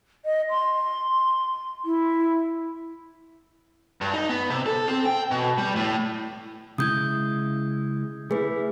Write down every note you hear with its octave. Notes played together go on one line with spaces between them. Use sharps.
D#5
C6
E4
G2
D#4
B3
C3
A4
C4
G5
B2
G3
A2
C#3 G#3 E4 D#6 G6 G#6
A3 E4 G#4 B4